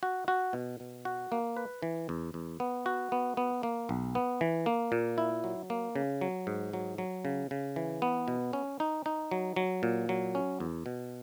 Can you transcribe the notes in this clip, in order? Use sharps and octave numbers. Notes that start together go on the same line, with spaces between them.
F#4
F#4
B2
B2
F#4
A#3
B4
E3
E2
E2
B3
F#4
B3
B3
A#3
B1
B3
E3
A#3
A#2
E4
F#3
A#3
C#3
F#3
G#2
F#3
F#3
C#3
C#3
E3
B3
B2
C#4
D#4
D#4
F#3
F#3
A#2
F#3
C#4
E2
B2